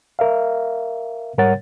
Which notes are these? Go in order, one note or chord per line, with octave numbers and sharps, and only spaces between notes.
A#4 E5 F5
G#2 G3 A#4 C#5 F#5 A6